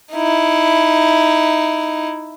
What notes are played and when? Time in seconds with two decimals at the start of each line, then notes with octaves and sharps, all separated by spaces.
0.13 D#4 E4